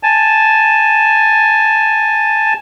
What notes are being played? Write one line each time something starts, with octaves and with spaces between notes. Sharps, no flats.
G#5 A5